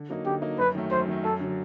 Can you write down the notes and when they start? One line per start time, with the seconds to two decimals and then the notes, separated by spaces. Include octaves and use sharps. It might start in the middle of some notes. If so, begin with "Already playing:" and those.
Already playing: D3
0.09 F#3 A#3 D#4
0.25 D3 G4
0.41 F#3 A#3 D#4
0.58 F#2 B4
0.75 D#3 F#3 A3
0.91 F#2 C5
1.08 D#3 F#3 A3
1.24 F#2 A4
1.40 D3 F#3